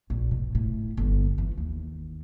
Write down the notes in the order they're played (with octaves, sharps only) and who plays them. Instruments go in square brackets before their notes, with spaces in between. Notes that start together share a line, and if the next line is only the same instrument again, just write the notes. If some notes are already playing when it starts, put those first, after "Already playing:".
[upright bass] A#1
B2
A2
G1
E3
D#2